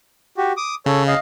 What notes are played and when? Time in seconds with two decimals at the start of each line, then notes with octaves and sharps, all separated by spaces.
0.37 F#4 G4
0.57 D6 D#6
0.86 C#3 A4 C#5
1.07 D#5 F5